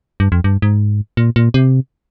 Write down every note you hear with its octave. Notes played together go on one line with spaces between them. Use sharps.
G2
F2
G2
G#2
A#2
A#2
C3